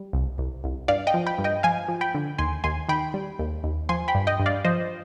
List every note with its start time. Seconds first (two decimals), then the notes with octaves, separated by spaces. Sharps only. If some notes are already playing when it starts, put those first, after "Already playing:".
Already playing: G3
0.13 C2
0.38 C2
0.64 C2
0.88 G2 D5 F5
1.07 D#5 G5
1.14 F3
1.26 G5 B5
1.38 G2
1.44 D#5 G5
1.63 F3 F5 G#5
1.88 F3
2.01 G5 B5
2.14 D3
2.38 D#2 G#5 C6
2.64 D#2 G#5 C6
2.89 D#3 G5 B5
3.14 G3
3.39 D#2
3.64 D#2
3.89 F3 G#5 C6
4.08 G5 B5
4.15 G2
4.27 D#5 G5
4.40 G2
4.46 D5 F5
4.65 F3 C5 D#5